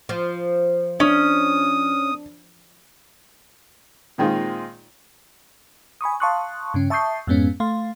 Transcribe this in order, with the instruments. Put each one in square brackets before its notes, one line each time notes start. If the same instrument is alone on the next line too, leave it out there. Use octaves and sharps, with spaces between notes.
[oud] F3
[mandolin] C#4 [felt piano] D4 [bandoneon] D#6
[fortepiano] A#2 D#3 G#3 C4 D#4 F4
[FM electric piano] G#5 B5 C#6 D#6
F5 A5 C6 C#6 D#6 F#6
G2 C#3 C#4
E5 A5 C#6 D#6 G6 C7
F2 G#2 G#3 B3 C#4
A3 F5 C6